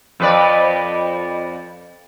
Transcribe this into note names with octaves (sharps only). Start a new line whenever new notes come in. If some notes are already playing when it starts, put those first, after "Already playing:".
F2 B4 D5